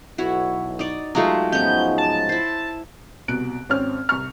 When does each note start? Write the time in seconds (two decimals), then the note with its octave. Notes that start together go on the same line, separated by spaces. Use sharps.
0.18 B1 E4 F#4 C#5
0.79 D#4 D5
1.15 F#3 G#3 A3 D#4 F4 G4
1.52 G#2 F3 B3 C#4 D#4 G6
1.98 A5
2.29 E4 C5
3.28 C2 B2 F#6 D7
3.69 G#1 C4 C#4 F6
4.09 C2 C3 C#6 F6